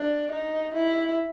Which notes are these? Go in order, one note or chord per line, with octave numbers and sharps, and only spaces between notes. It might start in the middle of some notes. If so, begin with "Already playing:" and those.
Already playing: D4
D#4
E4